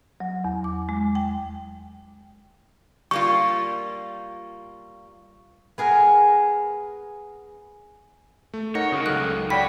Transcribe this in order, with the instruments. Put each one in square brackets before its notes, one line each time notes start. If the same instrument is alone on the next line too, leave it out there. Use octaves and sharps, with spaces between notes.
[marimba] F#3
E2
D6
G#3
G5
[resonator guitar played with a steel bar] G3 A#3 F4 [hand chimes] C#6
[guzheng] B3 G#4 A#4
[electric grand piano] A3
[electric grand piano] D#4 A#4 F#5 [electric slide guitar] C#5 [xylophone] A#6
[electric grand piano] C#3 [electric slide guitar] D#4 F#4 A#4
[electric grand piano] C#2 F#3 [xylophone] A4 F#6
[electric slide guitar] F#4 C#5 [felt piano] D5 G5 B5 [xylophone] B6